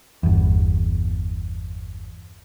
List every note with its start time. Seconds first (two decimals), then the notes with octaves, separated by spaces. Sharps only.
0.23 G1 E2